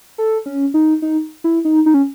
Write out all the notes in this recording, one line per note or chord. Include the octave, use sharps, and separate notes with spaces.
A4
C#4
D#4
D#4
E4
D#4
D#4
C#4